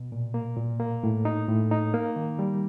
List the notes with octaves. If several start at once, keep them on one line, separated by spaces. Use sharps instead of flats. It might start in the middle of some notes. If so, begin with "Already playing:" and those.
Already playing: B2
A#2
A#3
A#2
A#3
A2
D#4
A2
D#4
A#3
D#3
G3